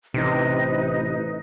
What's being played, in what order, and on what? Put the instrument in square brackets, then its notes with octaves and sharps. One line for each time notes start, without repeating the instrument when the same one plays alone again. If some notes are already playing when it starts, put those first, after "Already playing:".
[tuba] A1 [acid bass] C3 [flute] D#4 [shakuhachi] B4